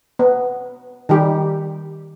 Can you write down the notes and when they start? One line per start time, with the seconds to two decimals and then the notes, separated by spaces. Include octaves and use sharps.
0.19 B3
1.09 D#3 G3 G4